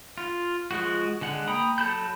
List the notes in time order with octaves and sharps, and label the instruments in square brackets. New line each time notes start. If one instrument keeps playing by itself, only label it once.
[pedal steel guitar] F4
F3 G#3 F#4
D3 G#3 F#5
A#3 G5 A#5 B5 D#6
F#3 A4 A5 B5 G6